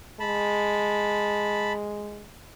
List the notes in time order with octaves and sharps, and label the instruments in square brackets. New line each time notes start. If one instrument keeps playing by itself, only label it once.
[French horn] G#3 [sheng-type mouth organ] A5 B5